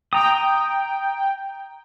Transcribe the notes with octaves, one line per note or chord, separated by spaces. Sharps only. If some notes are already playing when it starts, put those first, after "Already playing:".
G5 A#5 D#6